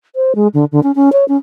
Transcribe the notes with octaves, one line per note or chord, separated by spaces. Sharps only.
C5
G#3
D3
D3
C#4
C#4
C#5
C#4